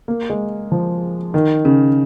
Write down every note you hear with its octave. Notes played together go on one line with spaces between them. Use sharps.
A#3
G#3
F3
D#3
C#3